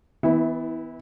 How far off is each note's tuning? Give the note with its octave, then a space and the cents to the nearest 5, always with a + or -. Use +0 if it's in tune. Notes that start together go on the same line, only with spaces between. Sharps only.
E3 -25 B3 +20 E4 -15